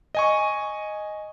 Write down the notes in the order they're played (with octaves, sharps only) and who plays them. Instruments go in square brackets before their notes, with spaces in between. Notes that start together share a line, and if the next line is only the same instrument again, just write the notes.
[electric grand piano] D#5 G#5 C#6